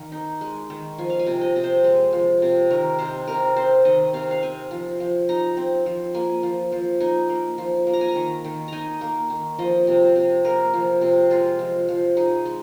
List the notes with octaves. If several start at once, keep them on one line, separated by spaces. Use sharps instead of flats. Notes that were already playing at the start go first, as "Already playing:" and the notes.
Already playing: D#3 F5
D#4
G#3
D#3
F3 G#5
F5
G#5
C3
D#5
C3
C5
G#3
F3
C3
D#3 A#4
C3 C5
C3 A#4
C4 C5
D#3 D#5
C3 F5
F5
C4 G#5
F3
F3
D#4 A#5
C4
F3
A#3 G#5
F3
F3
D#4 G#5
A#3
F3
A#3
A#5
G#5
A#5
D#3
D#3
D#4 G#5 A#5
A#3
D#3
F3 D#5
C3
C3
A#3 A#4
F3
C3
G#3 F4
F3
F3
D#4 G#4
G#3